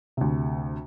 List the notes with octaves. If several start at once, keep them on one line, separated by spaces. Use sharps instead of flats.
D2 C3